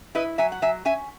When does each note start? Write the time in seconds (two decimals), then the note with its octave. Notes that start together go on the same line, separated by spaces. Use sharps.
0.15 E4 B4 D#5
0.38 F#3 E5 G#5
0.52 F#5
0.62 F#3 E5 G#5
0.85 C#4 E5 G#5